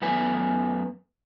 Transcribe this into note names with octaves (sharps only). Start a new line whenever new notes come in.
F#2 A3 B3 B4 G#5